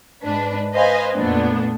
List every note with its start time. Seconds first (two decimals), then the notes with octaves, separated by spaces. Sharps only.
0.22 G#2 D4 B4
0.73 B4 C5 D#5 F5 G#5
1.13 F2 A#2 A3 B3 D4